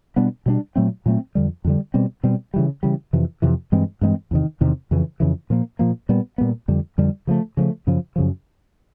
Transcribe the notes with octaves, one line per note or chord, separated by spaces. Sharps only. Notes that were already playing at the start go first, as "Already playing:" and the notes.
B2 G3 B3 D4
B2 G3 B3 D4
A#2 F#3 A3 C4
A#2 F#3 A3 C4
F2 D3 G3
F2 D3 G3
B2 G3 C4
B2 G3 C4
C#3 E3 G3
C#3 E3 G3
F2 C3 E3
F2 C3 E3
G2 E3 G#3 C4
G2 E3 G#3 C4
E2 C3 D#3
E2 C3 D#3
F2 C#3 E3
F2 C#3 E3
A#2 F3 A#3
A#2 F3 A#3
A#2 G3 B3
A#2 G3 B3
F2 D3 G3
F2 D3 G3
C#3 F3 A3
C#3 F3 A3
F#2 C#3 F3
F#2 C#3 F3